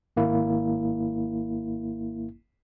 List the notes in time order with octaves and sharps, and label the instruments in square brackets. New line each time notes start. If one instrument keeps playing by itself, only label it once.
[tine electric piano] G#1 A#3 E4